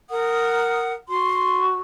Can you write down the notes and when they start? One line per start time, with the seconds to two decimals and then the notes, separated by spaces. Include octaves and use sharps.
0.10 A#4 F#5 D#6
1.09 F#4 C6